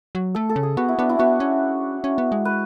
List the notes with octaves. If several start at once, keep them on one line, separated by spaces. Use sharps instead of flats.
F#3
A3 A4
A4
C#3
G#4
B3 F#4
E4
B3 D4
E4
B3 F#4
C#4
C#4
B3
G#3
B4